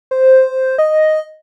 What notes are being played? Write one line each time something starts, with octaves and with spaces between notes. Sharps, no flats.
C5
D#5